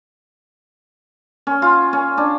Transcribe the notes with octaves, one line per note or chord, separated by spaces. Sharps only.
C#4
F4
C#4
D4